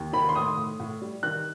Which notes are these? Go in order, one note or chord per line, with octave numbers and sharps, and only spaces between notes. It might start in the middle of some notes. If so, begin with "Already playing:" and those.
Already playing: D#2
D#3 B5
C6
A2 D#6
A2
A2
G3
D#3 F#6